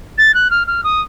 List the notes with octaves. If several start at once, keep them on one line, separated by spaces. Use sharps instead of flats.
A6
F#6
F6
F6
D#6